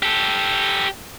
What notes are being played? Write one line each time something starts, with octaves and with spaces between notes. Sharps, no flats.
G4 A4